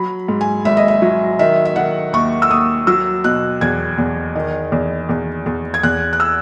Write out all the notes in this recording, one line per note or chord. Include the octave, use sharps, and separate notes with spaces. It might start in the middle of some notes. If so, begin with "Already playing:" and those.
Already playing: F#3 B5
G#2
G#5
G#1 E5
D#5
E5
F#3
D#3 E5
E5
D#3 F#5
D#2 C#6
E6
D#2 D#6
F#3 E6
B2 F#6
E2 G#6
E2
D#3
E2
E2
E2
G#6
E2 F#6
F#6
E6